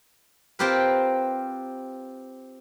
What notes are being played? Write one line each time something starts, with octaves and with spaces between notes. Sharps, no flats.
C4 F4 G4 A#4 B4